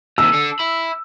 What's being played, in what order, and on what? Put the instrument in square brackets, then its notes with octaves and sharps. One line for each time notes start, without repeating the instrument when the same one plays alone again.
[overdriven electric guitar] D#2 C3 [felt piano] E6
[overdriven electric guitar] D4 A4
E5 B5